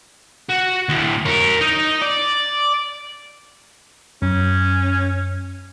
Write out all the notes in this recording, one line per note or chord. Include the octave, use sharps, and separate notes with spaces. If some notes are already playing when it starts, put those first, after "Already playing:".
F#4
D2 A2
A#4 C#5
D#4
D5
F#2 C#4